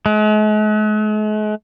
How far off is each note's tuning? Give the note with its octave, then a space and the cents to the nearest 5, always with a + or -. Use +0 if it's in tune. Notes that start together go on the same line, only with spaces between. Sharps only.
G#3 +45